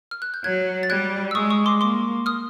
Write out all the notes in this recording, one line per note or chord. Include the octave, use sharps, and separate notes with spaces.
F6
F#6
G6
F#3 F#6 G#6
A6
G3 F#6 G#6
E6
G#3 C#6 D#6
C#6 D#6
C6 D6
A#3 C6 D6
D#6 F6